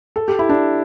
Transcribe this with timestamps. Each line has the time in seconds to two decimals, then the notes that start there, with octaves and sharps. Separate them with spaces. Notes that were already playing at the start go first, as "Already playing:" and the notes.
0.16 A4
0.28 G4
0.39 E4
0.49 D4